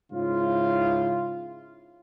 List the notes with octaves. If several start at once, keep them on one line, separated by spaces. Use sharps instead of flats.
G#2 C#3 E4 F4